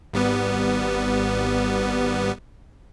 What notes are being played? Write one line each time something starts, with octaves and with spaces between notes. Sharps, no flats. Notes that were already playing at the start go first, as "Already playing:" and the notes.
G#1 G3 B3